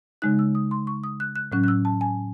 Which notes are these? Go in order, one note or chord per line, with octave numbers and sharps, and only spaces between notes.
C#3 G#3 D#4 F#6
E6
D#6
C6
C#6
D#6
F#6
F#6
A2 F#3 C#4 F#6
F#6
E6
A5
G#5